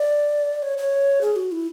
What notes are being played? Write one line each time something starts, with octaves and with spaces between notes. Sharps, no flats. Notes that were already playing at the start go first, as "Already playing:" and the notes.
Already playing: D5
C#5
C#5
G#4
F#4
E4